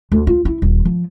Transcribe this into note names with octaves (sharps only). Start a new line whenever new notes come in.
D2
F4
E4
D#1
F3